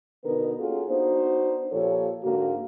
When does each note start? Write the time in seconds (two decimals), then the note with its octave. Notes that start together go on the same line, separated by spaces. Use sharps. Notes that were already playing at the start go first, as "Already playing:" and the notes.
0.24 B2 D3 B3 D#4 A#4 B4
0.59 A#3 C#4 F4 F#4 G#4 A4
0.88 B3 D4 D#4 F#4 C5
1.72 A#2 F3 G4 A4 C#5
2.23 G#2 D3 A#3 F#4